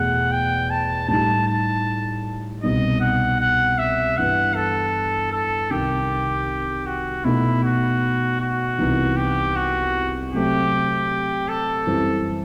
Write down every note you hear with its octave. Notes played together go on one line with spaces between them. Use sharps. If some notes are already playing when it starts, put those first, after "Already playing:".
Already playing: E2 B2 A3 F#5
G5
A5
A2 G3 D#4 A5
A5
C2 B2 G3 D#4 D#5
F#5
F#5
E5
G2 E3 B3 F#5
A4
A4
C2 C3 D#3 G4
F#4
B2 A3 D#4 E4
F#4
F#4
C2 C3 E3 B3 D#4
G4
F#4
C3 F#3 A3 C4 G4
A4
F#2 E3 G3 C4